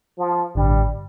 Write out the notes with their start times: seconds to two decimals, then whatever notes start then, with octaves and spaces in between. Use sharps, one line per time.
0.18 F3
0.55 A1 G2 D3 G3